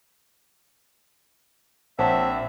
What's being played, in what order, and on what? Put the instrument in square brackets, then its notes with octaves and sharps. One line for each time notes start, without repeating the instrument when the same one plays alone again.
[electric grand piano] A#1 [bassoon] C4 [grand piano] C#5 F#5 A5 [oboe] E5